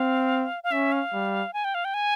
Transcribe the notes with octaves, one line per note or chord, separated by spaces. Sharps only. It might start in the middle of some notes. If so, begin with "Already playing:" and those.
Already playing: C4 F5
F5
C#4 E5
F5
G3
G#5
G5
F5
G5
G#5